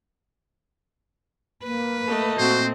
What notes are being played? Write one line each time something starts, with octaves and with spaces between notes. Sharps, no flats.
A#3 B4
A3 D#5
A#2 C4 F#4 C5